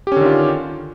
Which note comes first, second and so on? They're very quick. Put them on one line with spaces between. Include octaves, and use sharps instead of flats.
G4 C#4 D3 D#3 F4